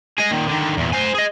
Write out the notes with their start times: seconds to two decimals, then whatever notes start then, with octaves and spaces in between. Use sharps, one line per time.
0.18 G#4 D#5
0.30 A#2 D#3
0.47 D3 D#3
0.77 E2 A#2
0.93 C5 G#5
1.15 G#4 D#5